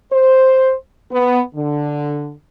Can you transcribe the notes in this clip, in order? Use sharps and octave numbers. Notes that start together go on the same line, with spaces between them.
C5
B3
D3